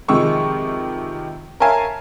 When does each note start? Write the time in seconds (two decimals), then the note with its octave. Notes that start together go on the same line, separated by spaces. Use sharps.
0.08 F2 C3 D#3 G#3 C#6 E6
1.60 A#4 C#5 E5 F5 G#5 A5